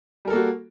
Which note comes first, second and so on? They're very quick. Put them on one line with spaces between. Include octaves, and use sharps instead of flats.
G3 A#4 A4 A#3 F#4